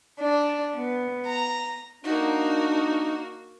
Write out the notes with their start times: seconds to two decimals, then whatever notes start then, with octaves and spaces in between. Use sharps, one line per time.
0.20 D4
0.76 B3
1.27 A#5
2.04 A#3 D4 D#4 F#4